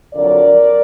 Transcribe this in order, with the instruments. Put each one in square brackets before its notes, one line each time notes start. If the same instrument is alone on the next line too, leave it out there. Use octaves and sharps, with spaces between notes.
[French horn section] F2 D3 F#3 A#4 D5